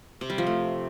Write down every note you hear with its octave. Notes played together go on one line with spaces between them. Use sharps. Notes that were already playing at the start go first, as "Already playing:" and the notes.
C3
G3
F3
A3